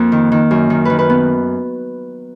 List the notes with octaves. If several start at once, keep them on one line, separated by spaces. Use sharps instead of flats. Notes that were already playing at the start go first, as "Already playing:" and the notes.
Already playing: F2 A#3
D#3
D#3
F#2
D#3
D#3 B4
B4
B3